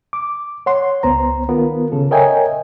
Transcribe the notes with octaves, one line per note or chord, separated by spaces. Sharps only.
D6
C#5 F#5 C6
C#2 B3 C5 A#5
D#3 B3 F4 A#4
C#3 A4
A#4 C#5 D#5 E5 G5 G#5